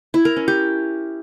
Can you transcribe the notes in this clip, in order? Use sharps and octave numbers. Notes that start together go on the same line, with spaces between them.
E4
A#4
C#4
G4